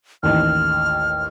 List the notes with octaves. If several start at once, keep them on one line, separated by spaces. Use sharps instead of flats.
A1 D#2 F6